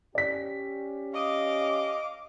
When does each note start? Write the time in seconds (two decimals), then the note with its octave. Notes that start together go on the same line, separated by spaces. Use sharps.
0.15 C#4 G4 D5 B6
1.15 D#5 F5 D6